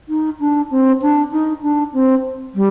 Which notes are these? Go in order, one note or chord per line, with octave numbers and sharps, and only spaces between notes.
D#4
D4
C4
D4
D#4
D4
C4
G3